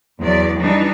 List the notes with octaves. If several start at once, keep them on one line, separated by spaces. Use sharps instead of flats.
E2 F#3 D5
E3 G3 D4 D#4